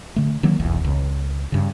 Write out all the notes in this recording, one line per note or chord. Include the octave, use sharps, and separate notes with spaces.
D3 A3
D#3 F#3 A#3
F1 B1 E2
C#2
G2 C#3